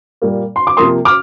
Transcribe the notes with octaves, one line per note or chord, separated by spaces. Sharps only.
A#2 G3 A#3
C6
D6
C3 F3 A#3 C6 D#6
D6 F6